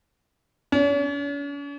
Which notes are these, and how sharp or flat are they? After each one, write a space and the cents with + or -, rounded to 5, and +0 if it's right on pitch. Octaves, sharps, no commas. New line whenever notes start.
C#4 +45